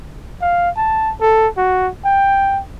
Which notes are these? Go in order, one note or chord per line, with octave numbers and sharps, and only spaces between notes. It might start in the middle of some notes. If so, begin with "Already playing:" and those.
F5
A5
A4
F#4
G5